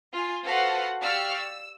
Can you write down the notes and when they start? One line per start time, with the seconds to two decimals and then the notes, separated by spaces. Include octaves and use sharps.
0.12 F4 F5 G#5
0.44 F#4 A4 B4 C5 F5 F#5
1.01 G4 D5 F5 C#6 E6 F6
1.34 E6